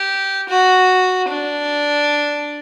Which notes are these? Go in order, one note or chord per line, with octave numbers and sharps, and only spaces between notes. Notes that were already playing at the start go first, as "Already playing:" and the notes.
Already playing: G4
F#4
D4